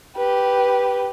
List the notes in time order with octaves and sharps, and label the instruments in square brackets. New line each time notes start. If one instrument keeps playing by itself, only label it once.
[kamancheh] G4 B4